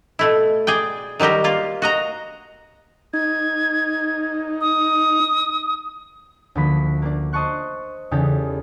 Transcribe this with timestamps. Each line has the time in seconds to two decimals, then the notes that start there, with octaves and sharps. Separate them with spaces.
0.19 B2 A3 E4
0.67 G#4 D5 G5
1.20 D#3 F#3 G3 G4 A#4
1.44 A#3 F4
1.82 F#4 D#5 A#5
3.13 D#4 G#6
4.61 D#6
6.55 D2 D3 F3 A#3 B5 B6
7.02 A#3 D4
7.33 C5 D#5 A5 C6 C#6 F#6
8.11 E2 C#3 D#4 G4 A4